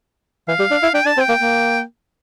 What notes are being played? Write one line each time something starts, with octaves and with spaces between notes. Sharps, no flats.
E3 F5
G3
D4
E4
D4 G5
D4 A5
C4
G5
A#3
A#3